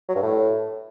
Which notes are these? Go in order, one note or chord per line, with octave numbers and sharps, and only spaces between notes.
F#3
G2
A2